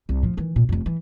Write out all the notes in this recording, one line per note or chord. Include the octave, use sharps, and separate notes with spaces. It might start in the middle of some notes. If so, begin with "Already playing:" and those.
C2
A2 F3
D#3 E3
A#2
F1 F2
E3